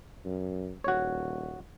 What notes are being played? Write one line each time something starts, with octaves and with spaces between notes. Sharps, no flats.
F#2
D#1 F#4 C#5